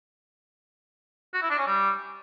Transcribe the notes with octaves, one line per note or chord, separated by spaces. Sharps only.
F#4
E4
D4
C#4
G3